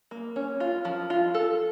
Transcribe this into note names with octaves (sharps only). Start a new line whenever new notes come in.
A#3
C#4
F4
F3
F4
A4